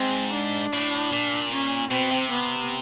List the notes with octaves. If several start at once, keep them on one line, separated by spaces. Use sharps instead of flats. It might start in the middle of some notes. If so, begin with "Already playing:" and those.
Already playing: G#2 C4
D4
A2
A#2
C#4
B2 C4
C3
B3